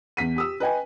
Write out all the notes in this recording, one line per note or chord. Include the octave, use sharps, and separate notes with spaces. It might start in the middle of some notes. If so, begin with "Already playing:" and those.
E2 B6 D#7
G4 D#6 E6
B4 D#5 G5 G#5